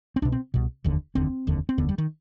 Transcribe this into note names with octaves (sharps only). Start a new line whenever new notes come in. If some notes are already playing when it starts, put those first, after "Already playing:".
C4
C2 B2 D4
C4
C2 B2
F1 D#2 D3
F1 D#2 D3 C4
F1 D#2 D3
C4
F1 D#2 D3 B3
G3
D#3